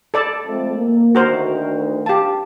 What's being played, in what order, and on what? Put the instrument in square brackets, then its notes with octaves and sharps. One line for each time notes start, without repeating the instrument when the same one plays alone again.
[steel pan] A4 D5 A5
[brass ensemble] F2 G#3 A3
A#3
[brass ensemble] D2 D#3 [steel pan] F#4 A#4 C5
[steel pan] G4 A5 [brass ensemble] F5